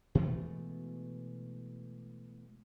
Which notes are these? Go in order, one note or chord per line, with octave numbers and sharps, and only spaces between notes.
B2 E3 G#3 A3